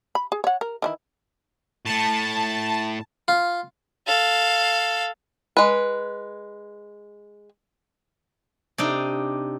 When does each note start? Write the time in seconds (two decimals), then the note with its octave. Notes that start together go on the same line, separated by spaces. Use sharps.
0.15 B5
0.32 G#4
0.44 C#5 F#5
0.61 A#4
0.82 D#3 E3 E4
1.86 A2 A3 A5
3.28 F4
4.07 A4 F5
5.57 G#3 B4
8.78 C3 D4 D#4 D5